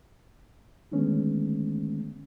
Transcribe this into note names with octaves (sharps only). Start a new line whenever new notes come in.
D3 D#3 G#3 A3 B3 C#4